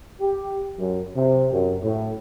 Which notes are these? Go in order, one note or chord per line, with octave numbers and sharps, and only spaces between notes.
G4
F#2
C3
F#2
A2